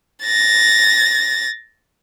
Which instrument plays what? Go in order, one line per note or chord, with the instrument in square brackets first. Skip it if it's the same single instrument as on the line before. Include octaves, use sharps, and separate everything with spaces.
[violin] A6 A#6